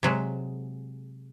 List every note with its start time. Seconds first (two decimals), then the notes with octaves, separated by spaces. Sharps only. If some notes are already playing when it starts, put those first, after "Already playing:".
0.03 C3 F#3 G#3